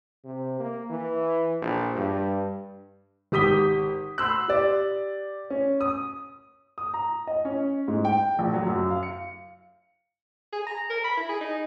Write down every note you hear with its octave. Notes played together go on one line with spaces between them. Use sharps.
C3
A#3
E3
A#1
G2
G#1 G4 D#6 B6 G7
B5 C6 E6 F#6
G4 D5
C#4
D#6
D#6
A#5
D#5
C#4
G#2
G5
A#1
F#3
F#2
F5
C#7
G#4
A#5
A#4
B5
E4
G#4
D#4